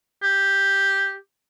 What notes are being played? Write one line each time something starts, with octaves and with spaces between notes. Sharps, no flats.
G4